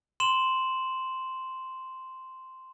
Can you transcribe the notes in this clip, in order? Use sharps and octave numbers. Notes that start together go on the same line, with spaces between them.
C6 E7 F#7